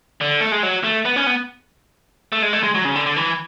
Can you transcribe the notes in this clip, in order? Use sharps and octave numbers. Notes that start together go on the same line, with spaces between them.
D3
A3
G#3
F#3
A3
B3
C#4
B3
A3
G#3
A3
G#3
F#3
C#3
D3
D3
E3